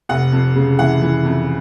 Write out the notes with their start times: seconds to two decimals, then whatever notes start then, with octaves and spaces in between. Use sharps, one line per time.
0.09 F1 F#5
0.32 F2
0.56 C#3
0.79 E3 F#5
1.02 E3
1.25 F2